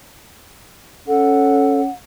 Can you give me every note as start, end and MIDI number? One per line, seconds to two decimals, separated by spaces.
1.08 1.88 61
1.08 1.81 69
1.08 1.91 78